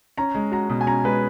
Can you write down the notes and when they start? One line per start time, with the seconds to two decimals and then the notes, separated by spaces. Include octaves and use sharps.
0.17 C#4 A#5
0.35 G#3
0.52 F#4 A#5
0.70 B2
0.81 G#5
0.87 C#4 A#5
1.04 G#3 B4